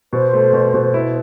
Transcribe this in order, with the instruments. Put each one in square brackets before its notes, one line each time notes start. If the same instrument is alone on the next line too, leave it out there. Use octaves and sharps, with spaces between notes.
[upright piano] B2 [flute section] C5
[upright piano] A3
B2
B2
E4